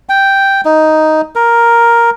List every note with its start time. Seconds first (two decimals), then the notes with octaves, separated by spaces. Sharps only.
0.09 G5
0.65 D#4
1.35 A#4